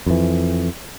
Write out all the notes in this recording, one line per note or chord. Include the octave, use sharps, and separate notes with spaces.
F2 E3